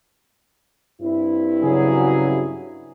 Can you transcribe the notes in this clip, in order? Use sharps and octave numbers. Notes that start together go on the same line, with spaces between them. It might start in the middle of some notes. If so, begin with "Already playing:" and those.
G2 C4 E4
C#3 F#3 G#4